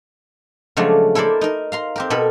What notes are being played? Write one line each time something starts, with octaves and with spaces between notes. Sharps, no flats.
C#3 F3 F#3 G#3 A3 D4
E4 A4 A#4 C5 D5
D#4 A#4
F5 A#5 C6
C4 G4 A#4
B2 A4 A#4 B5